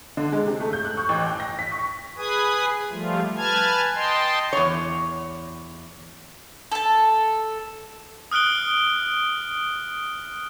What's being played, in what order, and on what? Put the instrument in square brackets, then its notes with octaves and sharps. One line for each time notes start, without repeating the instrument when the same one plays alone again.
[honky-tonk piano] D3
G#3
C3
A3
G6
F#6
C#6
A1
G5
A#6
B6
C#6
[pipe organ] G#4 B4 G#5 D#6
F3 G3 A3 F4
B4 G#5 A5 F6 G#6
D#5 G5 A5 C6
[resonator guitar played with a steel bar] E2 C#5
[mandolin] A4 A5
[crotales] D#6 F6 F#6 D7 G7